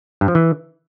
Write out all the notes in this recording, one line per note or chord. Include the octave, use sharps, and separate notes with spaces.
G2
F3
E3